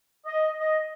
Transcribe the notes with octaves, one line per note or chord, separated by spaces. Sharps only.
D#5
D#5